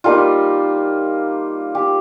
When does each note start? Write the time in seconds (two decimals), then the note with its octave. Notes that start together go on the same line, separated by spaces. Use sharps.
0.04 G3 A#3 D#4 F4
1.75 G4